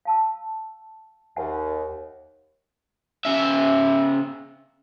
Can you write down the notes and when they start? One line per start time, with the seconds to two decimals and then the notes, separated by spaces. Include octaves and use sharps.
0.05 F5 A5 E6
1.36 D#2 E5 F#5 G#5
3.25 C#3 E5